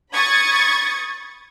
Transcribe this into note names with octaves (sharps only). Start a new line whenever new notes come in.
B5 C#6 D#6 G#6 A6